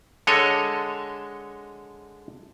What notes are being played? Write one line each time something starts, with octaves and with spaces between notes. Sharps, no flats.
D3 G#3 A4 C#5 D#5